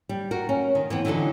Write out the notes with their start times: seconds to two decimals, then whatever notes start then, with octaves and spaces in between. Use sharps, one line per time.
0.09 G3
0.31 F#4 A#4
0.49 C#4
0.75 D#3
0.90 E3 B3 C4
1.05 D3 E3 F#3 D#4 A4